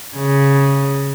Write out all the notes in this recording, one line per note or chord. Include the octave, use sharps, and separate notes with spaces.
C#3